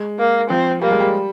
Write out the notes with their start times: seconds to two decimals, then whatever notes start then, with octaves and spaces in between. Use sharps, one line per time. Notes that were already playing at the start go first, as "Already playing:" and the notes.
Already playing: G#3
0.19 A#3
0.50 F3 C4
0.82 G3 A#3
0.91 G#3
1.00 G3